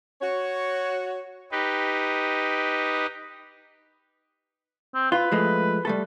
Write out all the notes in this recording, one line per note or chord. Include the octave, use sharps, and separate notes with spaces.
F#4 C#5
D#4 G4 B4 D#5
C4
F4 B4
F3 G#3 A3
G3 A3 A4